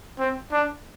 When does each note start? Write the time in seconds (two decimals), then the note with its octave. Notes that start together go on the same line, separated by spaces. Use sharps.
0.19 C4
0.52 D4